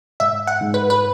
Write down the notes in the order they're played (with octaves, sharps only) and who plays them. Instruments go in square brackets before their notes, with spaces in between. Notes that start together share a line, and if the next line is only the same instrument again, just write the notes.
[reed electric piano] G#2 [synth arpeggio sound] E5
[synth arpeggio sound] F#5
[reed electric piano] G#2
[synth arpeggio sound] B4
B4